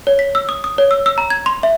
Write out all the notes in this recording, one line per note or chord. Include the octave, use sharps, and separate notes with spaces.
C#5
B6
E6
D#6
D#6
C#5
E6
E6
A#5
G#6
C6
E5